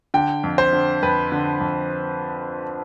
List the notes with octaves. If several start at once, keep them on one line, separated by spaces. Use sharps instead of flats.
D3 G5
F2
C5
D3
F2 B4
D3
F2